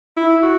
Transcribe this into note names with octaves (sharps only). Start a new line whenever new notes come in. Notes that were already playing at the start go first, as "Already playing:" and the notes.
E4
F#4